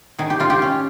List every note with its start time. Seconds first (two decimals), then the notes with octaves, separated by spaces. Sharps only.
0.18 D#3 G#4
0.30 G4
0.40 D#3 F4
0.50 G4
0.62 C#4